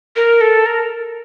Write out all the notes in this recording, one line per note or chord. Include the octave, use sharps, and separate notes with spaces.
A#4
A4
A#4